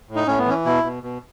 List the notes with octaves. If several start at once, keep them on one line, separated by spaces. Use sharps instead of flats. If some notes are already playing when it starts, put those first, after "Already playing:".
A2
D#4
A2 C#4
B3
E3 C#4
B2 E4
B2
B2